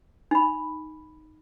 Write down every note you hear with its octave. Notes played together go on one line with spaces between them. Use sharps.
D#4 B5